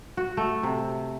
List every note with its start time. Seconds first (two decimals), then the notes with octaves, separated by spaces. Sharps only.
0.17 F#4
0.37 A3
0.63 C3